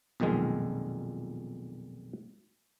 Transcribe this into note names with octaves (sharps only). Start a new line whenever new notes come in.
B1 F2 A#2 D#3 G#3